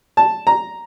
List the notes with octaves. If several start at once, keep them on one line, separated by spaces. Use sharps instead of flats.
A5
A#5